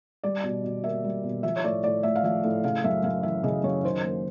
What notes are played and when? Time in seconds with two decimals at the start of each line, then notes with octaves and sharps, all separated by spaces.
0.23 G3 D5
0.44 B2
0.64 B2
0.84 A#3 E5
1.04 G3
1.24 B2
1.43 F3 E5
1.56 C#5
1.64 A2 D5
1.84 A2 D5
2.03 A3 E5
2.16 F5
2.23 F3 E5
2.44 A2
2.64 C#3 F5
2.84 F#2 E5
3.03 F#2 F5
3.23 E3 E5
3.43 C#3 D#5
3.64 F#2 C#5
3.83 D#3 C5
4.04 A#3